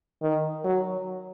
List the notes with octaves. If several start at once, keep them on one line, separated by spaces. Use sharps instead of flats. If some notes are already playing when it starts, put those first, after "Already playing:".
D#3
F#3